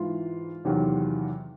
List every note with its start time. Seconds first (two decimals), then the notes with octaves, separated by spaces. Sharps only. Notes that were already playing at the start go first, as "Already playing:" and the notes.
Already playing: G#2 E3 F4
0.65 E2 C3 D#3 F#3